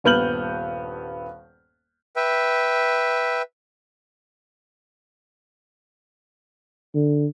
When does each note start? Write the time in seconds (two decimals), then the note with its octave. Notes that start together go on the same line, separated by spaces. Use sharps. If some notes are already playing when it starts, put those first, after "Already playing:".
0.04 D#1 G2 B3 F6 G6 F#7
2.16 B4 E5 G5
6.95 D3